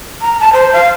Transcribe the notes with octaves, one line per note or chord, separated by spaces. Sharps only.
A#5
A5
C5
F5